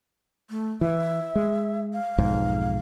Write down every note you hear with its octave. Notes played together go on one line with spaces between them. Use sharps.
A3
E3 E5
G#3
F5
B1 F2 G#2